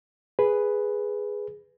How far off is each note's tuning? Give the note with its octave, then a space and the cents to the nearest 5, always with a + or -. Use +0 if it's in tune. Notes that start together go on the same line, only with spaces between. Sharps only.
G#4 +0 B4 +0